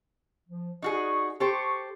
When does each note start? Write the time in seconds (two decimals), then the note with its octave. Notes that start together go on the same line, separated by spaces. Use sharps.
0.49 F3
0.82 D#4 F#4 G#4 D5 C#6
1.40 G4 A4 C5 C#6